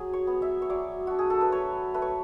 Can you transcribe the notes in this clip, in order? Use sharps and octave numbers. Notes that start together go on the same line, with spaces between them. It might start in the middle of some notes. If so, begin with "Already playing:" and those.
Already playing: F#3 G#4
C#5
B3
E5
C#5
F#3 D5
D4 F#4
G#4
A4
B4
F#3 C#5
A3 B4
C#5